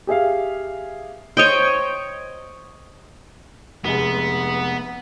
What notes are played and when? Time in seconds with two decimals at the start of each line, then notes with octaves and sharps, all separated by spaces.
0.07 G4 G#4 E5 F5
1.37 C5 C#5 D#5 G5
3.85 F1 G#3 B3 G#4